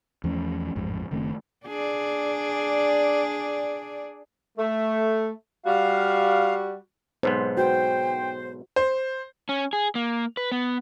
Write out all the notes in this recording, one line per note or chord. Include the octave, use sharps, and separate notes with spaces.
E2 F3 A3 C#4
A1 F2 G#2
F#1 D#3 A3 C4
D4 G#4 D5
A3
G3 F#4 F5
B1 G#2 B3 C5
F#4 C5 G5
C5
C#4
G#4
A#3
B4
B3